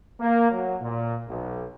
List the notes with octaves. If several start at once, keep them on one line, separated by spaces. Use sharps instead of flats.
A#3
F#3
A#2
B1